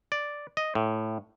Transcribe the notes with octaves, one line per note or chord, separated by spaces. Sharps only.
D5
D#5
A2